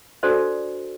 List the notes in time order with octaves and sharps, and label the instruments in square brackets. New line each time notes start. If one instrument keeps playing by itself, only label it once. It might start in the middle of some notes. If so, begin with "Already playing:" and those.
[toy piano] D4 F#4 A4 C5 D5